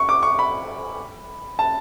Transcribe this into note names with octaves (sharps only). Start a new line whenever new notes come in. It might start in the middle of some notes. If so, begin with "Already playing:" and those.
Already playing: C#6
D6
C#6
B5
A5